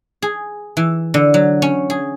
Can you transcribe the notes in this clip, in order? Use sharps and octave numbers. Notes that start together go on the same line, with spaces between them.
G#4
E3
D3
F#3
C#4
G#4